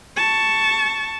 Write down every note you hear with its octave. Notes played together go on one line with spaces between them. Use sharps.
A5 C#6